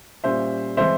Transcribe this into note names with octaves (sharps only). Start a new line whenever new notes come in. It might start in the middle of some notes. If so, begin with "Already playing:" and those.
A#2 G3 C#4 C5 E5
E3 G#3 C4 C5 E5